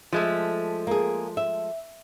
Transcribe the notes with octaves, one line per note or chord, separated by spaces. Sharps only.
F3 G#3 A3
A#3 G#4
E5